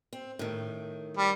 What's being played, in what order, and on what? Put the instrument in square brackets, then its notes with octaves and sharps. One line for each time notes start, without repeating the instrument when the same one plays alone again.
[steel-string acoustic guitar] C4
A2 D#3
[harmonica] G3